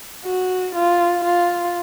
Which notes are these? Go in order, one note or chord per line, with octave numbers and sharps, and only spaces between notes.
F#4
F4
F4